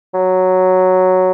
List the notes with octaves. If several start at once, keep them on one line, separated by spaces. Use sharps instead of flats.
F#3